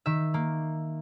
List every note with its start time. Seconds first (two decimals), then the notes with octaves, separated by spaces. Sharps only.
0.06 D#3 E5
0.34 A#3